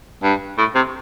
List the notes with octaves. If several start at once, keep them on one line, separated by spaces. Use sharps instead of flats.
G2
A2
C3